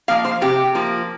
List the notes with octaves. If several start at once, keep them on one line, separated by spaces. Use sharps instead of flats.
F3 A#3 F5
C5
C3 G4
F3 A#3